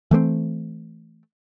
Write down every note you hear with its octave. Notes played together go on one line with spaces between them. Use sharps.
E3 A3 A#3 C4